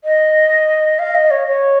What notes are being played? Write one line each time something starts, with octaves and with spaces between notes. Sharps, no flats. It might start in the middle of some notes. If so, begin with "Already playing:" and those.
D#5
F5
D#5
C#5
C#5